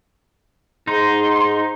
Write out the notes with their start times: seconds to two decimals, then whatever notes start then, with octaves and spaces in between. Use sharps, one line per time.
0.87 G#2 D#4 C6